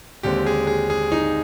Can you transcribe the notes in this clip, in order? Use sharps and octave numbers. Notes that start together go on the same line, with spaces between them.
D#2 D3 G#3 C4 G4
G#4
G#4
G#4
D#4